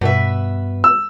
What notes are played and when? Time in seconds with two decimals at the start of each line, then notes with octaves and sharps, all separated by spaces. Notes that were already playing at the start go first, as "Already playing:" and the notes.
0.01 G2 B2 B4 E5
0.84 E6